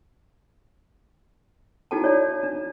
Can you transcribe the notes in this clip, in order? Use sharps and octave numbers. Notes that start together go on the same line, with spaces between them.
D#4 E4 F#4 A4 G5 A5
C#5 D5
D4